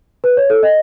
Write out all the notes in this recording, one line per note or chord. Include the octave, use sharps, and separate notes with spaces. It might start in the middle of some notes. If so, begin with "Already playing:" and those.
B4
C#5
A4
D#5